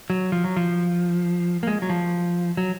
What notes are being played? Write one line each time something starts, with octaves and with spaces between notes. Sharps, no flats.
F#3
F3
F#3
F3
A#3
G#3
F#3
F3
F#3